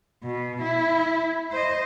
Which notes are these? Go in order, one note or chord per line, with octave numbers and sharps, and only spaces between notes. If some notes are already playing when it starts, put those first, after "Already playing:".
B2
E4
C5 D#5